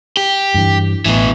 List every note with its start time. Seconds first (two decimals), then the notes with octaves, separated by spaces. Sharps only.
0.17 G4
0.54 G2 E3
1.06 A1 B2 E3